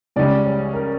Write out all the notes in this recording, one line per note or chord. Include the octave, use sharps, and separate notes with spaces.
C#2 C#3 G3 C#4 D5
C#5
A#4